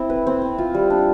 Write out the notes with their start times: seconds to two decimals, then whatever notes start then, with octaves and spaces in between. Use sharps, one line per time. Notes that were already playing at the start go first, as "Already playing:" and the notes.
Already playing: C4 E4
0.10 B4
0.27 C4
0.42 C4
0.58 F4
0.75 G3
0.90 D4